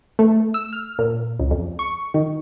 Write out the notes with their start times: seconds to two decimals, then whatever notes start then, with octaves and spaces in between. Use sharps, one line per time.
0.19 A3
0.54 E6
0.73 F6
0.99 A#2
1.39 C#2
1.51 F2
1.79 C#6
2.14 D#3